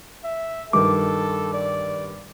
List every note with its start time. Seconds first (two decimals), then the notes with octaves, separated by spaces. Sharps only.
0.25 E5
0.73 G2 D#3 A4 D6
1.54 D5